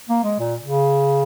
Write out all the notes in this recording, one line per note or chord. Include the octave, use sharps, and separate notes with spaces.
A#3
G#3
A#2
C#3